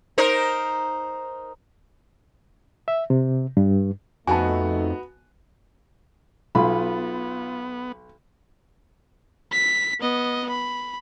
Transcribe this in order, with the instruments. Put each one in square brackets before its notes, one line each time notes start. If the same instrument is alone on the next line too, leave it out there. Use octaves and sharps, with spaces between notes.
[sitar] D#4 A#4 C5
[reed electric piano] E5
C3
G2
[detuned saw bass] F2 [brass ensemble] A3 D#4 [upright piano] B3 F#4 [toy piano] G#5 A5
[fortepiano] B1 [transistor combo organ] B3 [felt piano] F4 [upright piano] B5
[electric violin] B6
B3 D#5
B5